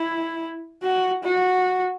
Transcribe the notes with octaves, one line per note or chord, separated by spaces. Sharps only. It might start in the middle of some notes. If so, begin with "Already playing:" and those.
Already playing: E4
F#4
F#4